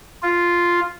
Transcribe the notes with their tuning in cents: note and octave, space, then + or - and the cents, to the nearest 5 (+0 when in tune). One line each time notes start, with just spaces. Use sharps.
F4 -5